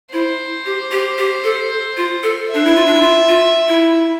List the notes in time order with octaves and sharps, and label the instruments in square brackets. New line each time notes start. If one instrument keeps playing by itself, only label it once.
[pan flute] E4 [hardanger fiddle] C5
[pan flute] G4
G4
G4
A4
F4
A4
[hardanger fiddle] E5
[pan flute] D4
E4
F4
D4
E4
F4
F4
E4